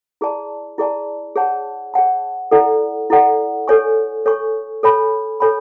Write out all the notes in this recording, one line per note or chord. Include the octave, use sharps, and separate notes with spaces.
E4 G#4 D5 A5
E4 G#4 D5 A5
G#4 C#5 F#5 A5
G#4 C#5 F#5 A5
E4 A4 D5 F#5
E4 A4 D5 F#5
A4 C#5 G#5 C#6
A4 C#5 G#5 C#6
A4 C#5 G#5 B5
A4 C#5 G#5 B5